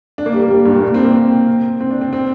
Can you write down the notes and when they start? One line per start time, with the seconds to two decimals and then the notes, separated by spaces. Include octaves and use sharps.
0.18 D4
0.26 A#3
0.34 G3
0.42 A#3
0.51 G3
0.66 G2
0.73 A#2
0.83 A#3
0.94 C4
1.05 A#3
1.16 C4
1.80 C4
1.91 D4
2.01 C4
2.13 C4